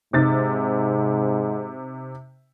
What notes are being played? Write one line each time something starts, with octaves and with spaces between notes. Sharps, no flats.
G#2 C3 D#4 A6